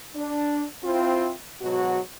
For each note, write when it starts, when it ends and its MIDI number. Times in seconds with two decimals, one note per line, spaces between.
0.15 0.64 62
0.85 1.31 60
0.85 1.31 64
0.85 1.31 65
1.62 1.99 44
1.62 1.99 47
1.62 1.99 54
1.62 1.99 66